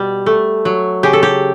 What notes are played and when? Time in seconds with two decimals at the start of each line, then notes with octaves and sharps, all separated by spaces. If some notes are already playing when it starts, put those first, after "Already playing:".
Already playing: B2 G3
0.26 A3
0.65 F#3
1.03 C#3 G4
1.13 A4
1.23 G4